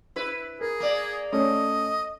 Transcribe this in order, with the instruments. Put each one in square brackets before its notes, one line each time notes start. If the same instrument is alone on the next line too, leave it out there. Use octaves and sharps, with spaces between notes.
[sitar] E4 B4
[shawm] G#4 [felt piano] A#4
[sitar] A#3 D5
[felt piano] A3 C#4 [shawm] D#5